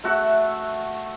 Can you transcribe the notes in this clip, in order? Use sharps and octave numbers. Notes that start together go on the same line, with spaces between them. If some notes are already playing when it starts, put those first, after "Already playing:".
A3 F#4 E5 F#5